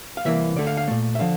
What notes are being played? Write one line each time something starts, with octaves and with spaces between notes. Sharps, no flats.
F5
C2 C3 E3 A#3 E5
D2 D3 A3 D5
F5
F5
A#2 A3
E5
D3 F3 F5